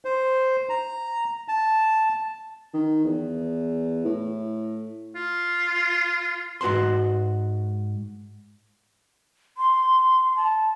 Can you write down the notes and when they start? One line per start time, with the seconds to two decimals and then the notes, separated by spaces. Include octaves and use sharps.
0.05 C5
0.69 A#5
1.48 A5
2.74 D#3
3.05 E2
4.05 A2
5.15 F4
6.61 G#2 F#4 B4 A5 C6
9.58 C6
10.37 A5